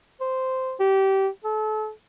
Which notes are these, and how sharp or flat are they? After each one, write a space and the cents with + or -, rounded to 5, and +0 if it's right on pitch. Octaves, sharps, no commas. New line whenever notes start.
C5 -10
G4 -20
A4 -35